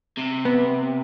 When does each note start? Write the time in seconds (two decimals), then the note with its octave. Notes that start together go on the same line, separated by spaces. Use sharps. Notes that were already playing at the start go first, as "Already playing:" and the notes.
0.17 C3
0.45 B3